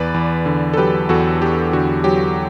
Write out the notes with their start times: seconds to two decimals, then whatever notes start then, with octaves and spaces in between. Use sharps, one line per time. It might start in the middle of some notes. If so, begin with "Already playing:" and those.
Already playing: E2 B4 D5
0.14 E2
0.46 D3
0.73 A4
0.77 F#3 G4 B4
1.09 E2 F#4 A4
1.41 E2 G4
1.73 D3 F#4
2.04 F#3 G4